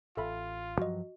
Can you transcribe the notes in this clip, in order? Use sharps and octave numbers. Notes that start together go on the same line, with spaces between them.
A1 F4 A4 E5 B5
G2 F3 F#3 F#4 D#5